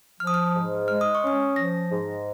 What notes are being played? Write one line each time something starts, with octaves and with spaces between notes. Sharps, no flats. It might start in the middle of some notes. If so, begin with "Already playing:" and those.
F3 F6
D#6
F6
G#2
G#3 F6
D#6
C#6
C#4 D#6
F3 A#6
G#2